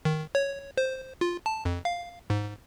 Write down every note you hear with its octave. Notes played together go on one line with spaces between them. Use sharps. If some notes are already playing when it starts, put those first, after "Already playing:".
D#3
C#5
C5
F4
A5
F2
F5
G#2